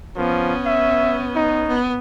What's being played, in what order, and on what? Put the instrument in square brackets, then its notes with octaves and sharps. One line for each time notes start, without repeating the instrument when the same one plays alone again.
[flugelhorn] F3 [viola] B3 C#4
[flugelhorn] E5
D#4
[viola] B3